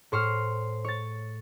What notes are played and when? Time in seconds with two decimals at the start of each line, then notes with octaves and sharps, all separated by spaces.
0.12 A2 C5 C#6 F6
0.85 C#5 A6